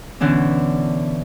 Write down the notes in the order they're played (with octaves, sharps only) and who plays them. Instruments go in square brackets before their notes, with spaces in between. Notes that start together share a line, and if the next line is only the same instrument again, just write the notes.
[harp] B2 D3 E3 C#4 D4